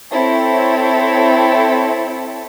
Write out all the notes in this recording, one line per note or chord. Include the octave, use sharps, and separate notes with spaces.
C4 E4 A4 C#5